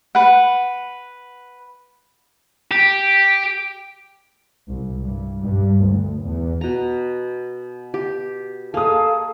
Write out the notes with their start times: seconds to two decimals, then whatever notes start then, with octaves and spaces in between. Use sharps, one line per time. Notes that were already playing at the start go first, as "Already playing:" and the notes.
0.15 B4 F#5
2.71 G4
4.68 C2
5.00 G2
5.41 G2
5.84 D2
6.22 E2
6.61 B2 A#5
7.94 G4
8.74 A#3 G#4 A4 F5 A5 D#6